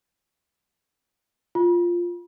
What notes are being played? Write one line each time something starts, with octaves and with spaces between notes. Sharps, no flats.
F4